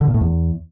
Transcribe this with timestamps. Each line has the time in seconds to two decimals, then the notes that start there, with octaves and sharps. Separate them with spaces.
0.01 D3
0.08 A#2
0.14 A2
0.21 E2